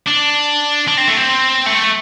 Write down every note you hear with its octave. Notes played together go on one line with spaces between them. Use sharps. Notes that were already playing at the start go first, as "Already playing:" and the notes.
D4
D4
C4
A3
C4
A3